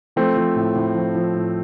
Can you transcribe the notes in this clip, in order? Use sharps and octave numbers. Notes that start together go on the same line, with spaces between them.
F3 A3 C4
F3
A2
A2
F3
F3
A2